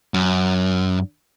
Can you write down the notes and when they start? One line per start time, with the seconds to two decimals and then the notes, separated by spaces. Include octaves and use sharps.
0.14 F#2